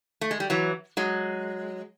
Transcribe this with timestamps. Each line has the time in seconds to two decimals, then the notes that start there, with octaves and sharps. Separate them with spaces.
0.21 A3
0.31 G#3
0.40 G3
0.50 E3 F#3
0.97 F#3 G#3